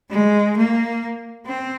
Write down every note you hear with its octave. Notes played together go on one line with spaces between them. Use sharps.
G#3
A#3
C4